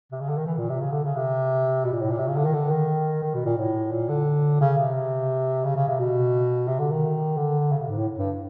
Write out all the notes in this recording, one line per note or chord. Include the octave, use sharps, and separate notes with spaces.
C3
C#3
D3
D#3
E3
A#2
C3
C#3
D3
C#3
C3
B2
A#2
A2
A#2
C3
C#3
D3
D#3
D3
D#3
D#3
B2
A#2
A2
A#2
D3
C#3
C3
C#3
C#3
C3
B2
C3
D3
D#3
D3
C#3
C3
G#2
A2
G2